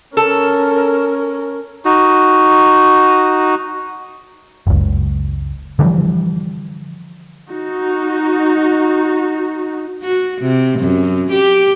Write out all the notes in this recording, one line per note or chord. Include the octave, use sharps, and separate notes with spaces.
C#4 A4 A#4
D#4 F#4
F#1 C#2
D3 E3 F3 G3
D#4 F#4
F#4
C3
F#2
G4